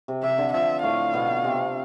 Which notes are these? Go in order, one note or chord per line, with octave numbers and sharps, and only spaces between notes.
C3
C3 E5
D3
F3 E5
A2 A3 F5
B2 B3
C3 C4